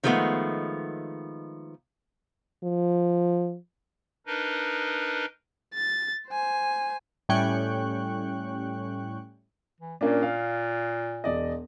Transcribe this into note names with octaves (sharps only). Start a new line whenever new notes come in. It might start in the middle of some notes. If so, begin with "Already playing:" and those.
D#3 F3 G#3 A3 B3
F3
D4 D#4 A#4 B4 D#5
A6
C5 G#5
A2 G3 C#4 G5 C#6 F#6
E3
A#2 A#3 C#4 D4
F5
E1 D5 D#5